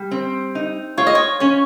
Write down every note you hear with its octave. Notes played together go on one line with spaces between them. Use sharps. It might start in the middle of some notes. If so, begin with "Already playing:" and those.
Already playing: G3
C4
D#4
F4 C#5
D#5
C#5
C#4 C#5